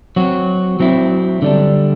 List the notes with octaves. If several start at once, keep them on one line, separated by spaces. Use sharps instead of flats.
F#3 C4 F#4
F#3 C4 E4
D3 G3 D4